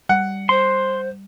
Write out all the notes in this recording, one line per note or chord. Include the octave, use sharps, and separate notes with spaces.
G3 F#5
C5 C6